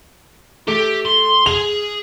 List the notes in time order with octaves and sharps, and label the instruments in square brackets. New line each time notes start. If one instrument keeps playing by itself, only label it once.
[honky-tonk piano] A3 [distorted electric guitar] G4
[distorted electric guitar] C6
[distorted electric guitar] G#4 [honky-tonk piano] F7